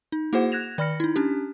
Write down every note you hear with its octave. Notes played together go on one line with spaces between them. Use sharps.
D#4
A#3 E4 F#4 G#4 C5 F#5
F#6 G#6 A#6 E7 F7
D#3 D5 B5 F6 A#6 C#7
D#4 E4
C#4 D4 G4